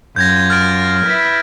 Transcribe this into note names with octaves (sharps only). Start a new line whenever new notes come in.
F#2 F4 G6 G#6 A#6
F6 A6 D7
E4 B4